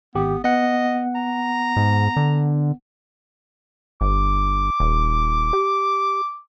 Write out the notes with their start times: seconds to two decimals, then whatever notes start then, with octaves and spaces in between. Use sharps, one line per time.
0.15 G#1 B3 G4
0.44 B3 D#5 F#5
1.15 A#5
1.76 G#2
2.16 D3
4.01 G1 D6
4.80 D#1
5.53 G4